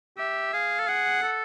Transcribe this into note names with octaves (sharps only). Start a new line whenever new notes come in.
G4 E5
G#4 F5
A4
G#4 F#5
A4